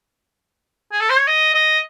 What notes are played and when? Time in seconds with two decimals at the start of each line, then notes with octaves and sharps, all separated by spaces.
0.92 G#4
1.01 A4
1.10 C5
1.19 C#5
1.28 D#5
1.54 D#5